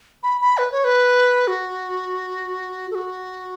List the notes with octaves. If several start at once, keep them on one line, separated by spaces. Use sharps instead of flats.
B5
B5
B4
C#5
B4
F#4
A4
F#4